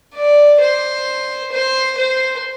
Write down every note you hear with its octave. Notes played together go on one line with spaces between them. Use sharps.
D5
C5
C5
C5